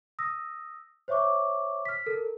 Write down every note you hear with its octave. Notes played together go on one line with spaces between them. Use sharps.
D#6 E6 A#6
C5 C#5 E5 C#6 D6
F6 B6
A4 A#4